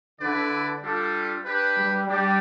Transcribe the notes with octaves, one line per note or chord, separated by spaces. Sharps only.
D3 E4 B4 D5
G3 D4 F4 A4
D4 G4 B4
G3
G3 D4 G4 D5